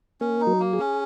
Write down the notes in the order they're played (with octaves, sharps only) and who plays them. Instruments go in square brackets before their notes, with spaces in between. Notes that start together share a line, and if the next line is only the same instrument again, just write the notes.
[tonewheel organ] A#3 [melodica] C#4
[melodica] D#4
[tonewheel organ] F#3
[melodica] A#3
[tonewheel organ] G#4
[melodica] C#4